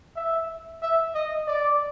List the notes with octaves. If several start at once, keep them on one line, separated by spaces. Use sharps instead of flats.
E5
E5
D#5
D5